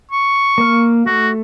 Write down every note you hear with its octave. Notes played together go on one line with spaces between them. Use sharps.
C#6
A#3 F5
A3 F#4